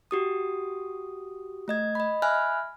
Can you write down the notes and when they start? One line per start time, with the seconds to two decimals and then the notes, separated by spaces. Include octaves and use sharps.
0.11 F#4 G4 D#6
1.68 A3 D#5 G#6
1.95 D#5 B5
2.22 E5 G#5 B5 F6 F#6